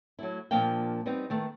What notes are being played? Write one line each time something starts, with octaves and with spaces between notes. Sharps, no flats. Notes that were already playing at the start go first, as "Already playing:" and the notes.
F#3 A3 E4
A#2 F3 A#3 D4 F5 G5
G3 B3 C4 D#4
D#3 A3 B3